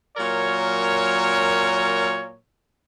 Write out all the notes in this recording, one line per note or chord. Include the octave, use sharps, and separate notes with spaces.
A#2 F#3 A#4 C#5